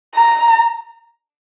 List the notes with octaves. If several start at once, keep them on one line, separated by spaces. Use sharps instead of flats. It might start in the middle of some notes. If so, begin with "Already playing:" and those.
A#5